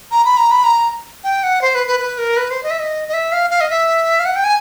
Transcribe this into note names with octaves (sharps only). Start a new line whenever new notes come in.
A#5
B5
A#5
B5
A#5
G5
F#5
C5
B4
B4
B4
A#4
B4
C5
D#5
E5
D#5
D#5
E5
F5
F5
D#5
E5
F5
F#5
G5
G#5